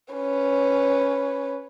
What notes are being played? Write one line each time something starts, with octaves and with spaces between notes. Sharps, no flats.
C#4 B4